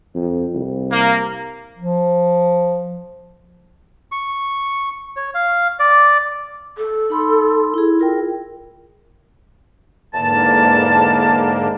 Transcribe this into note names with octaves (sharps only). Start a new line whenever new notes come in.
F2
C2
A#3
F3
C#6
C#5
F5
D5
A4
D#4 B5 C6
E4 G#4
F4 A#4 G5
E2 G#2 D3 A#3 A5